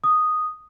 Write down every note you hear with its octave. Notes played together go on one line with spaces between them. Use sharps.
D#6